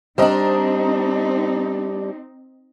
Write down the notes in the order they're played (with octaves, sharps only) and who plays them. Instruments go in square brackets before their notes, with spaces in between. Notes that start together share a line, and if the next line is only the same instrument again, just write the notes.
[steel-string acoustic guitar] G3 D4 [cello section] C4 D#4 [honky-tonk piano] C5 D#5 A#5